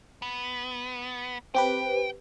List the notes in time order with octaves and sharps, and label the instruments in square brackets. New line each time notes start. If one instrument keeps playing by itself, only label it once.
[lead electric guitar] B3
[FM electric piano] C4 G4 B4 [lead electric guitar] G5